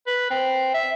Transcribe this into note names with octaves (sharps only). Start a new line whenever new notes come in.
B4
C4
E5